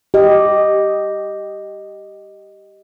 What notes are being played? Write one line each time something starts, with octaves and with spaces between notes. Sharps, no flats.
G4 D#5